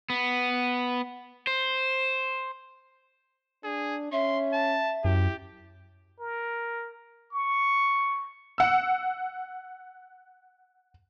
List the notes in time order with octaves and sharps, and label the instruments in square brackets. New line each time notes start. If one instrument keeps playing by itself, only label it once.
[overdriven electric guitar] B3
C5
[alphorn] D4 [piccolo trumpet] G#4
[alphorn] C#4 [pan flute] E5 [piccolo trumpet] C6
[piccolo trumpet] A5
[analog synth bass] F#2 [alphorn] E4 [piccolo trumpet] G4
[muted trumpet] A#4
C#6
[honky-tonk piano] F#5 E6